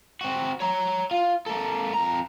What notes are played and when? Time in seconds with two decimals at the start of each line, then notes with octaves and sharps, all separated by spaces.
0.21 C4 F#4
0.60 C#5 A#5
1.11 F4
1.46 A#3 A4
1.94 F2 A#5